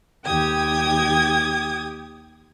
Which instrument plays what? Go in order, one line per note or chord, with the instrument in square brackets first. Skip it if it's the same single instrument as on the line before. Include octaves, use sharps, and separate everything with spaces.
[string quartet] D#2 G4 G5 D#6 G#6